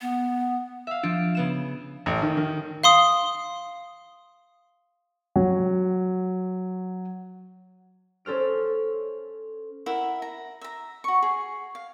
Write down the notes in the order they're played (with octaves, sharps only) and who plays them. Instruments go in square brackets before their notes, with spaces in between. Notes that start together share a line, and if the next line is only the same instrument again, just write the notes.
[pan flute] B3
[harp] E5 F5
[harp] F3 [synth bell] D4
[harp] C#3 B3 E7
[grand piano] A1
D#3
D#3
[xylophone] F5 C6 D#6
[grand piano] F#3 F#4
[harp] C#4 A4 C5 F6 D7
[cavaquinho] E4 A#4 E5 F#5
A#5
E5 A#5
F#4 C#6
G#4
F5